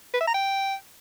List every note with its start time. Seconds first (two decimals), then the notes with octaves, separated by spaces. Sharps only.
0.14 B4
0.20 E5
0.27 A#5
0.34 G5